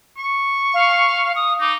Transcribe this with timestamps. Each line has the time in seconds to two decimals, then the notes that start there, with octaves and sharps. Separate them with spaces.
0.17 C#6
0.74 F5
1.36 D#6
1.60 D#4 D6